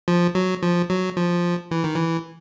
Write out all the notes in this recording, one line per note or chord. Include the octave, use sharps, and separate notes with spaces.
F3
F#3
F3
F#3
F3
E3
D#3
E3